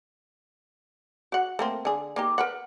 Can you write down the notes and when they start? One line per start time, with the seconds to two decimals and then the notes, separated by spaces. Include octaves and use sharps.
1.32 F#4 F#5
1.59 A3 A#3 C4
1.85 D3 G#4
2.16 A#3 D#4 G4
2.38 A#4 B4 F#5